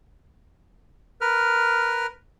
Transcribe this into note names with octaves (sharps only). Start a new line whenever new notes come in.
A#4 B4 F6